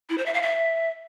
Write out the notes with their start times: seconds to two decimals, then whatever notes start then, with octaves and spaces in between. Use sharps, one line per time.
0.10 E4
0.18 C5
0.26 E5
0.34 F5
0.42 E5